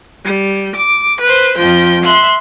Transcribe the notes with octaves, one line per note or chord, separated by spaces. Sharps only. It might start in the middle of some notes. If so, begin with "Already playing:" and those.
G3
D6
B4 C5
F2 F3 G5
E5 C6 F#6